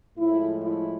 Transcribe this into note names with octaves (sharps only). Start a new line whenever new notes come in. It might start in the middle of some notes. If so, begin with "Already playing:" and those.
A2 F3 G#3 E4
E4